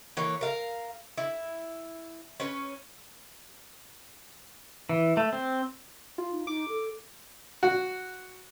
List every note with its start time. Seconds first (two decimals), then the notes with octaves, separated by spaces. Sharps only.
0.17 E3 A#3 C#5
0.41 A#4 F5
1.17 E4
2.40 C#4 B4
4.89 E3
5.17 A3
5.33 C4
6.18 F4
6.32 D#4
6.47 D#4 D6
6.68 A4
7.63 F#4